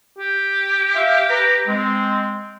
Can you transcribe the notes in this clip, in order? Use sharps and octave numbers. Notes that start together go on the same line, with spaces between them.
G4
E5 F5
B4 A#5
G#3 C4